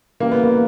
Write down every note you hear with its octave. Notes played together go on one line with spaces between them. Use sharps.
C#3 E3 G3 A#3
B3
A#3